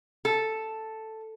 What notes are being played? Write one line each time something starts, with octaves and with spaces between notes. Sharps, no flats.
A4